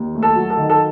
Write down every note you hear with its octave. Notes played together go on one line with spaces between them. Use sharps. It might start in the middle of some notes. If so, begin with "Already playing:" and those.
Already playing: D#2
A3
A4
F#3
A4
D#3
A4